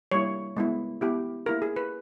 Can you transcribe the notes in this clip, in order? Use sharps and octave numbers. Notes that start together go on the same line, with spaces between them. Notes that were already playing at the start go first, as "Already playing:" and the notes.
G3 A#3 E4 C#5
G#3 B3 E4
B3 E4 G4
A#3 E4 G4 A#4
G#4
B4